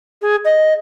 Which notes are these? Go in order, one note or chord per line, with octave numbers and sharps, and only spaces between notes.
G#4
D#5